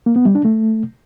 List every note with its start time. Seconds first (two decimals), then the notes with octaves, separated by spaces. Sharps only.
0.06 A#3
0.16 B3
0.25 G3
0.35 D4
0.45 A3